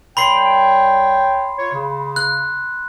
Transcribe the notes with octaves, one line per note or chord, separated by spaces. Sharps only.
C2 C#5 G5 B5 C6 C7
F4 C#5
C#3
F#6